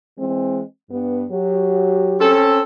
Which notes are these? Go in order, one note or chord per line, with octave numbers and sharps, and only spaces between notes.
E3 G#3 C4
G2 B3
F#3 G4
C4 C#4 A4